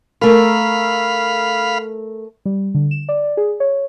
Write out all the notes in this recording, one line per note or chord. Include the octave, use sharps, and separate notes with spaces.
A3 A#4 F5 B5
G3
D3
E7
D5
G#4
C#5